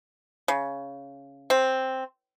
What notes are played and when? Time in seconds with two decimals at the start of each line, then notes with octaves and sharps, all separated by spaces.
0.48 C#3
1.50 C4